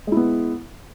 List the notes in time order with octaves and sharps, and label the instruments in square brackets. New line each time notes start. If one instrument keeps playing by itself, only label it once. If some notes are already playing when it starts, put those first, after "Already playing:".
[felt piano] G#3
E4
B3